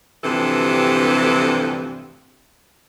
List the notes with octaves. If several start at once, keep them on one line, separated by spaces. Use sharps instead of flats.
D2 G2 C3 E3 F3 A4